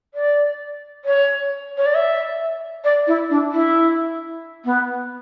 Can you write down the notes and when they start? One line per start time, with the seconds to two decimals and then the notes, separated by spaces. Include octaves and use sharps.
0.14 D5
1.05 C#5
1.78 C#5
1.86 D5
1.95 E5
2.84 D5
3.07 E4
3.30 D4
3.52 E4
4.65 B3